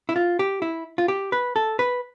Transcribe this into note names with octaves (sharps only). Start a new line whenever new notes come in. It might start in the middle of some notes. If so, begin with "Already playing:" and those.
E4
F4
G4
E4
F4
G4
B4
A4
B4